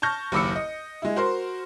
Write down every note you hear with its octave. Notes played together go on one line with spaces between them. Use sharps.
A5 C#6 F6 G6 A#6
F#1 D#2 B5 D6 E6 C#7
D#5
G#3 E4
F#4 A#4 C5 C6